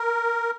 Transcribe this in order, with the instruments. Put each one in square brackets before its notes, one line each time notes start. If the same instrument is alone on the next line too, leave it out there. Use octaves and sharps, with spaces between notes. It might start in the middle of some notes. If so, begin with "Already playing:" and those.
Already playing: [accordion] A#4